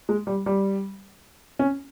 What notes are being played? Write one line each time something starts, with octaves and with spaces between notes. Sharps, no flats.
G#3
G3
G3
C#4